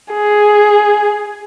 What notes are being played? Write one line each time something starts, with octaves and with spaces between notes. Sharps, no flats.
G#4